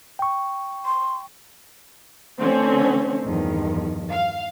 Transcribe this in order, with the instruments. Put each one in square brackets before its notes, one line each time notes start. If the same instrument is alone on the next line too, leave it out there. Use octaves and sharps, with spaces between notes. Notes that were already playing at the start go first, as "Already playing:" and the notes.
[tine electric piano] G5 C#6
[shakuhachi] C6
[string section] D3 E3 A3 C4 C#4
E2 G2 D#3 F3
F5